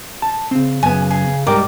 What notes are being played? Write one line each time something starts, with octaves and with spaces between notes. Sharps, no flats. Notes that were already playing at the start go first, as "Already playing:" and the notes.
A5
C#3 C4
F#2 B3 G#5
G#4
G#2 G3 A#4 G5 D6